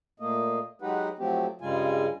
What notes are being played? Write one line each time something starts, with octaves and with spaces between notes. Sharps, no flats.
A#2 A3 A#3 D#5
F#3 G#3 D#4 G4 B4 F#5
F3 F#3 A3 C4 G4
G2 C#3 G3 G#3 F4 G#5